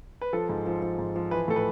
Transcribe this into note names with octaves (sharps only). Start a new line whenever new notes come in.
B4
F3 A4
G#2
F3
F3
G#2
F3
E3 B4
A2 A4
B4